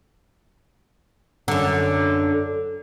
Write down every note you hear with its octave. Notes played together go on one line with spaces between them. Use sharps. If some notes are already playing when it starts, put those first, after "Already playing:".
F#2 D3